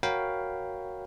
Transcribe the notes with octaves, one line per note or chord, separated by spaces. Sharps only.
F#4 A#4 C#5 F5 G5 B5